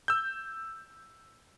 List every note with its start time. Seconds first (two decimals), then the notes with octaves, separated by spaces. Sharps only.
0.08 E6 G6